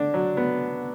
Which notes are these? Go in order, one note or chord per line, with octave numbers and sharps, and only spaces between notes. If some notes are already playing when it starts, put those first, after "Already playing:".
Already playing: D3 D4
F#3
B3